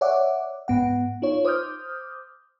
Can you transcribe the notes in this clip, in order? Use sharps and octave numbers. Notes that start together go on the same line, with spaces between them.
C#5 D5 E5 F#5 D6
G#2 B3 F#5
D#4 F4 C#5
C5 D6 D#6 F6 G6